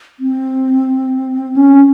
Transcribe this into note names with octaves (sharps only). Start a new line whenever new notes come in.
C4
C#4